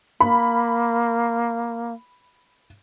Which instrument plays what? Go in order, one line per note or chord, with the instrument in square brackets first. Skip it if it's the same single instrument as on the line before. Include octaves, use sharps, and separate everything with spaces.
[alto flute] A#3 [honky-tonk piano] B5